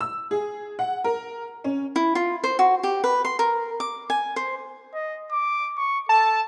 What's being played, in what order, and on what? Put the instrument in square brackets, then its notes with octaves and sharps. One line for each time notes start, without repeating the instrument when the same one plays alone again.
[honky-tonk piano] E6
G#4
F#5
A#4
C#4
[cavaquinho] E4
F4
C5
F#4
G4
B4
C6
A#4
D6
G#5
C5
[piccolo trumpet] D#5
D6
C#6
[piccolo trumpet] A4 [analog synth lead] A5